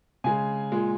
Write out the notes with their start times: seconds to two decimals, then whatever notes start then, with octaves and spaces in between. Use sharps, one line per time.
0.24 C#3 G#3 G#5
0.72 A#2 G#3